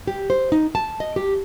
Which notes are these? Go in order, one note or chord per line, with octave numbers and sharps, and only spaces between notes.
G4
C5
D#4
A5
D#5
G4